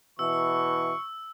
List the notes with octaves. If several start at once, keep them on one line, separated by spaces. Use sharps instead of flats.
B2 E3 C#6 E6